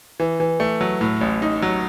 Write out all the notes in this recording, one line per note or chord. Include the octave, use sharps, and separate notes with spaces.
E3
E3
A3
F#3
A2
A1
D#4
F#3